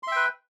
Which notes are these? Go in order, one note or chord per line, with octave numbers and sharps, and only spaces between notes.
B4 E5 G5 C6